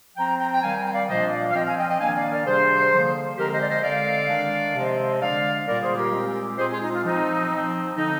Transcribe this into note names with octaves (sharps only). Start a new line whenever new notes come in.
F3 C4 G5 A#5
G5 A#5
G5
D#3 G3 C4 F5 G#5
G5
D5 F5
A#2 F3 A#3 D4 C5 D#5
D5 F5
F5
F3 C4 D#5 G5
F5 G#5
D#5 G5
D#5 G5
D#3 A#3 D4 F5 G#5
D5 F5
A#4 D5
C3 G3 D4 G#4 C5
D3 F3 A#3
D3 G#3 C4 G4 A#4
C5 D#5
D5
C5 D#5
D3 G#3 C4 D5 F5
D#3 G#3 D4
C3 F3 G#3 C4
D3 G#3 D4 D5 F5
A#2 G3 A#3 A#4 D5
G#4 C5
G4 A#4
A#2 G#3 C4
A#2 G#3 C4 G#4 C5
F4 G#4
D#4
F4
F3 C4 D#4
F3 C4
D3 F3 C4 D#4